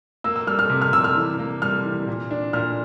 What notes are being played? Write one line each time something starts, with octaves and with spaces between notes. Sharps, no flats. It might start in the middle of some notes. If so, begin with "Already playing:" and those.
A#3 E6
E6
G3 F6
F6
C3
F6
C3 E6
F6
E3
A#3
G3 F6
E3
A#2
D4
A#2 F6